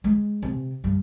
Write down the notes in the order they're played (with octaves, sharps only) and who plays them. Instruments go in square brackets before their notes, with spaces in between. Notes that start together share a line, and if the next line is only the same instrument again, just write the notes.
[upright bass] G#3
C3
G2